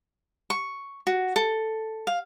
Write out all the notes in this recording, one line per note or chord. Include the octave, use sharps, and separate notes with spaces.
C#6
F#4
A4
F5